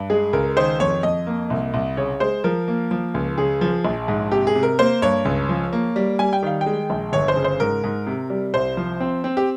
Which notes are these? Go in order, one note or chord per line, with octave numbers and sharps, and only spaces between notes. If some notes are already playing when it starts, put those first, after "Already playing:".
Already playing: G2
G#3 G#4
C#2 A#4
D#3 C5
F2 C#5
F2 D#5
A#3
C2
C2
C#3 C#5
G#3 C5
F3 A#4
A#3
F3
C#2
C#3 G#4
F3
A#1
G#2
C3 G4
G#4
C3
A#4
A#3 C5
G2 C#5
C#2
F3
A#3
G3
G3 G#5
G5
D#3 F5
G5
G#3
A#1
G1 C#5
C5
C#3
C5
G#2 A#4
G#2
C3
G3
C2 C5
F3
C4
C4
G4